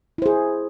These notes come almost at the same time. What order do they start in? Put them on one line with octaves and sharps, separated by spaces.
E4 C5 G#4